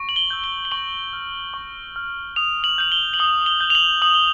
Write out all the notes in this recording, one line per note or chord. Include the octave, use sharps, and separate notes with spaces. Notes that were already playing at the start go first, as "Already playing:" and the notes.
Already playing: C#6
F#7
G7
E6 G6
G7
G7
C#6 F#7
F6
C#6
F6
D#6 F7
F#7
G6 F#7
G7
F#7
D#6 G7
G7
G6
F7
F#7
D#6 F#7
G7